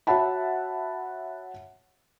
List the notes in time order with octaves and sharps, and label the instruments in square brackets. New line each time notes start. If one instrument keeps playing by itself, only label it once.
[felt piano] F#4 C#5 E5 F#5 A5 B5